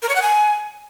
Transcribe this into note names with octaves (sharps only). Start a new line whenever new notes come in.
A#4
C#5
F#5
G#5